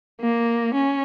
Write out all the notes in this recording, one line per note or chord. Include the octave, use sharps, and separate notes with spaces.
A#3
C#4